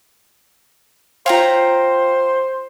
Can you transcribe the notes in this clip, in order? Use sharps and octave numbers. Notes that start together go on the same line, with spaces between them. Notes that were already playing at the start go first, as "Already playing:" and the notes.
F4 C5 C#5 F5 G5 A#5